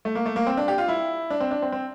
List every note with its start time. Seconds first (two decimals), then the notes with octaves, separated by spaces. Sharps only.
0.05 A3
0.15 A#3
0.26 A3
0.36 A#3
0.47 C4
0.57 D4
0.68 G4
0.78 F4
0.88 E4
1.30 D4
1.40 C4
1.51 D4
1.62 C4
1.72 C4